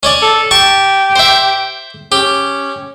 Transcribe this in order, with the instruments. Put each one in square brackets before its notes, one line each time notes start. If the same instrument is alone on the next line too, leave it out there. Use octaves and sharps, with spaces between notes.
[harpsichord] C#4 C#5 D5
[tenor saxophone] A4
[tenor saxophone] G4 [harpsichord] A5 C#6
[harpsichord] C5 E5
[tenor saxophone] C#4 [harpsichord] G4